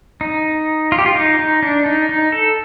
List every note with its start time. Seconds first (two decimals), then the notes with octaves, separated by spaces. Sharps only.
0.21 D#4
0.92 F4
0.98 G4
1.06 F4
1.15 D#4
1.39 D#4
1.63 D4
1.86 D#4
2.09 D#4
2.32 A4